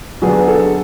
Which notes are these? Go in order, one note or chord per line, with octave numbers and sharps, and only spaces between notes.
D3 F#3 B3 D4 G#4
A4